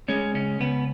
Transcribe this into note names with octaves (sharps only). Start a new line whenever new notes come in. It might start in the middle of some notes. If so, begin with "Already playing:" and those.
G#3 C#4
C#2 C#4
C#2 B3